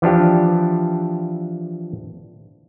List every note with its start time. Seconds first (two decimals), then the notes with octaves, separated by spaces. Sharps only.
0.02 E3 F3 D4 G4